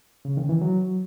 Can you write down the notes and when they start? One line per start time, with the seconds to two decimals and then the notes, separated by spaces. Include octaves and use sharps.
0.25 C#3
0.37 D#3
0.49 E3
0.61 F#3